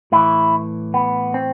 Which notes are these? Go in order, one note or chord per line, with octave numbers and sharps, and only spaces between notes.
A2 E3 E4
B3
C4